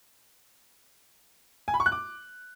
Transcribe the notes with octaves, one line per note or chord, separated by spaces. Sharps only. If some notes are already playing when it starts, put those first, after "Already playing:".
G#5
B5
C#6
F#6
D6